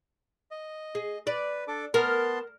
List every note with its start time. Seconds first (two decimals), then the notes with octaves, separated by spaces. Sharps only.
0.51 D#5
0.95 G#4
1.27 B4 D5
1.68 D4 A4 D6
1.94 B3 A#4 A5 C6